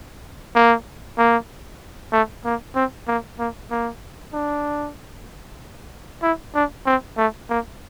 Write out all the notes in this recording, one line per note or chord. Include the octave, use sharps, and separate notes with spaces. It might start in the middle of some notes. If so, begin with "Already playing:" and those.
A#3
A#3
A3
A#3
C4
A#3
A#3
A#3
D4
E4
D4
C4
A3
A#3